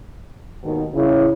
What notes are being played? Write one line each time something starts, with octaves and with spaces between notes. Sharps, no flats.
D#2 G#2 B2 D#3
C#3 E4